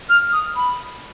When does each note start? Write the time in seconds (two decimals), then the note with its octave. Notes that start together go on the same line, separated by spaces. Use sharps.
0.09 F6
0.32 D#6
0.56 B5